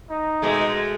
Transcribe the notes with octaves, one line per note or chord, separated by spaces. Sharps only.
D#4
B2 G#3 A3